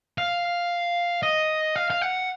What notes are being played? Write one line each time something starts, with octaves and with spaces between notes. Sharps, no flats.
F5
D#5
F5
F5
F#5